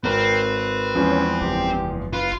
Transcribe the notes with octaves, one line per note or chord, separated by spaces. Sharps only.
G#1 C4 A#4 B4
E2 F3 G#3 C#4
F#1 G4
F4 B4